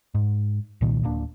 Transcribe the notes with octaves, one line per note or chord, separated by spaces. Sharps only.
G#2
C2 A#2 D#3
D1 A#3 D4